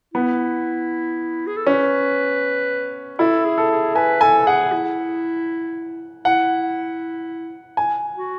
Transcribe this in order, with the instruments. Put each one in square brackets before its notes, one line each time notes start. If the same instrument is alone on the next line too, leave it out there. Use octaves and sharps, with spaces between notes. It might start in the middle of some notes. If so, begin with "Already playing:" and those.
[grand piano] B3 [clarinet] E4
[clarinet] G#4
A4
[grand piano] C#4 [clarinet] B4
[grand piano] E4 [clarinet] A4
[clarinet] G#4
[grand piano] A4
[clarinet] G#4
[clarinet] B4 [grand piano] G#5
[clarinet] A4 [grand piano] G#5
[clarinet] G#4 [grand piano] F#5
[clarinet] E4
[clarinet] E4 [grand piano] F#5
[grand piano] G#5
[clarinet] F#4